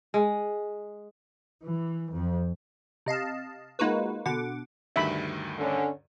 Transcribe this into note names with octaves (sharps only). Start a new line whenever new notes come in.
G#3
E3
F2
C3 D#5 F5 A5
G#3 A#3 D#4 F4 F#4 B4
B2 D3 F#5 D6
D2 G2 D#3 E5 B5
D3 C#4